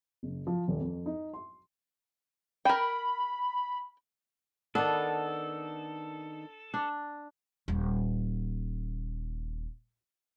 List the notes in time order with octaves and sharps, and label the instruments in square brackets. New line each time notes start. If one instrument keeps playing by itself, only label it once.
[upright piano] F#1
F3
D#1
F2
D#4
C6
[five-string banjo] A#4 G5 [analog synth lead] B5
[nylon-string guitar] D#3 B3 [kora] D4 [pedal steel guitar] A4
[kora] D4
[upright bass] D#1 A#3